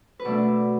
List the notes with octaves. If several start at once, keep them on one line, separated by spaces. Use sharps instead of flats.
B4
B2 A3 D4 D5